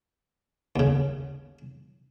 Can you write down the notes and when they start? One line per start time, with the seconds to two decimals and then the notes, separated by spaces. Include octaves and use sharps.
0.76 D#2 C#3